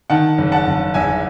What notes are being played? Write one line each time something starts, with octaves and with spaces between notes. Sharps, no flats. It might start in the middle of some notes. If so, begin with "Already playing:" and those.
D#3 F#5 A5
F#1
F#5 A5
F#1
E2 E5 G#5